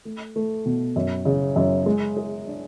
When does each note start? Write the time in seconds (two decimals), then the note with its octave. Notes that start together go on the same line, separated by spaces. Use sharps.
0.05 A3
0.36 A3
0.66 B2
0.96 F#2
1.25 C#3
1.56 F#2
1.86 G#3
2.17 G#4
2.47 D4